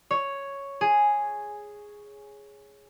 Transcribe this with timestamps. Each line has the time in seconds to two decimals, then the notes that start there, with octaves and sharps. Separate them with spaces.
0.11 C#5
0.81 G#4